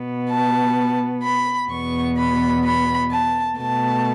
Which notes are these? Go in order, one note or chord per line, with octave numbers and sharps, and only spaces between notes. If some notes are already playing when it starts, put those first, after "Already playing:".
Already playing: B2 B3
A5
B5
E2 B2 B3 C#6
B5
B5
A5
B2 A3 A5